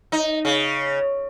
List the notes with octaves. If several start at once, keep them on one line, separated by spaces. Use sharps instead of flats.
D#4
C#3